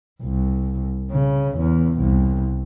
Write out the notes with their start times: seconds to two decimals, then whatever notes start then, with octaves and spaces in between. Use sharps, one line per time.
0.22 C2
1.11 C#3
1.58 E2
1.99 C2